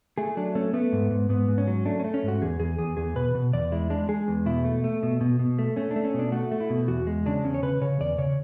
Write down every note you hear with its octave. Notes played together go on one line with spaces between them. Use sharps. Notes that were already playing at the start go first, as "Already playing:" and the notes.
A3 G#4
F#3 D4
A3 C#4
A3 B3
G#2
G#2
G#2 B3
G#2
C#4
F#3
A3 D4
C#4
A3
C#4
G#2 F#4
E2 G#4
E2 G#4
E2 G#4
E2 G#4
B2 B4
B2
E2 D5
G#3 E4
G#3 D4
G#3 G#4
E2
B2 E4
A3
A3
B2
B2
B2
A3
A3 C#4
D4
A3
C#4
B2
D4
A3 F#4
A3
E4
B2
E2 F#4
G#3
C#3 D4
E2 C#4
C#5
C#3 B4
C#3 C#5
E2 D5
C#3 C#5